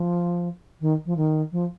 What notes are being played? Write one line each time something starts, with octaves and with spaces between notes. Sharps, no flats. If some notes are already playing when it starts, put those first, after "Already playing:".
Already playing: F3
D#3
F3
D#3
F3